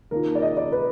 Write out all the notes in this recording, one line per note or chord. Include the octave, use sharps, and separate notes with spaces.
D#3 A#3 F4 A#4
D5
D#5
D5
B4